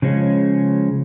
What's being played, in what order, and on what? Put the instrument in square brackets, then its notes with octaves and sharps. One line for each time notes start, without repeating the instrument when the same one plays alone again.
[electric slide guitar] C#3 F3 G#3 C#4